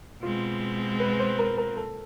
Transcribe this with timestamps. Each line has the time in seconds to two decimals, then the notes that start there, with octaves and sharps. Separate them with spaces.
0.22 B2 G#3 C4 F4
1.00 B4
1.20 C5
1.39 A#4
1.58 A#4
1.77 A4